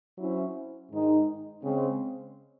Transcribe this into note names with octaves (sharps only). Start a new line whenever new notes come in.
F#3 C#4 E4 C5
G#2 D#3 G#3 D#4
C#3 G#3 C4